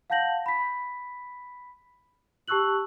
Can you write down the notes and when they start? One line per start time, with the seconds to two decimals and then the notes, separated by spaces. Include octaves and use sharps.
0.10 F5 F#5 A5 G6 A#6 F#7
0.46 B5 B6
2.48 G4 A5 C#6 E6 F#6 F#7